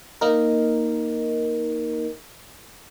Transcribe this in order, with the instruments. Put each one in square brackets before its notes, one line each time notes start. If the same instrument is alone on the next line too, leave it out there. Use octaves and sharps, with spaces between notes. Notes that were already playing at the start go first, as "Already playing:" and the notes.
[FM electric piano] A#3 D#4 A#4